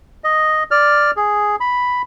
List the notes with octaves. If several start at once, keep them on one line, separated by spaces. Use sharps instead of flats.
D#5
D5 F6
G#4
B5